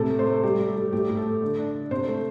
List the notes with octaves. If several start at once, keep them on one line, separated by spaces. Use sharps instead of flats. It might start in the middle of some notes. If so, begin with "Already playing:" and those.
Already playing: A2 C3 A4
A3
C5
A3
G3 G4
G3
A4
G3
A2 G4
A2
A4
A3
D3
D4
D3
C3 C5
A3